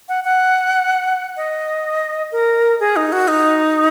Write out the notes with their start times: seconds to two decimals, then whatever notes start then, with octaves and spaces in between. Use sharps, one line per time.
0.09 F#5
0.24 F#5
1.37 D#5
2.32 A#4
2.80 G#4
2.96 D#4
3.12 F#4
3.28 D#4